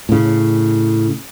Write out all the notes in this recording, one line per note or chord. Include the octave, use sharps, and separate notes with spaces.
A2 C#3